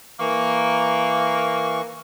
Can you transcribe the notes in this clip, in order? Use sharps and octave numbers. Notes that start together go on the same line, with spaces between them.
E3 A#3 C#6